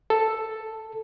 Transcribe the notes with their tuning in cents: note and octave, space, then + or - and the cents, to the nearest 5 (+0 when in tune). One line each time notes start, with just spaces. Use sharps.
A4 +5